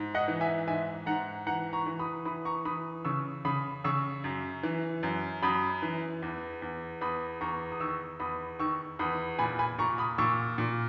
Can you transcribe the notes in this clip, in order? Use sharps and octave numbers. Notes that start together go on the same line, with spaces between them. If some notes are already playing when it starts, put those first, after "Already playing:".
Already playing: G#2
D#5 F#5
E3
E5 G#5
G#2 E5 G#5
G#2 F#5 A#5
E3 F#5 A#5
A#5 C#6
E3
B5 D#6
E3 B5 D#6
A#5 C#6
E3 B5 D#6
C#3 C#6 E6
C#3 B5 D#6
C#3 C#6 E6
F#2
E3
F#2
F#2 B5 D#6
E3
E2
E2
E2 B5 D#6
E2 A#5 C#6
D#6
D#3 C#6 E6
E2 B5 D#6
D#3 C#6 E6
E2 B5 D#6
A#2 G#5 B5
G#5 B5
A#2 A#5 C#6
B5 D#6
A#2 C#6 E6
A#2